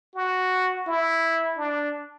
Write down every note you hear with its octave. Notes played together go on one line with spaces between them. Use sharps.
F#4
E4
D4